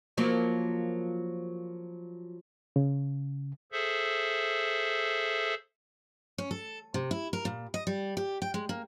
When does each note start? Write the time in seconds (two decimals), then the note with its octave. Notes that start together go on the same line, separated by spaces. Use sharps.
0.17 F3 F#3 A#3
2.76 C#3
3.72 G#4 A4 C5 E5
6.38 C#4
6.51 A4
6.94 C3
7.11 E4
7.33 A#4
7.45 A#2
7.74 D#5
7.87 G3
8.17 G4
8.42 G5
8.54 G#3
8.69 A#3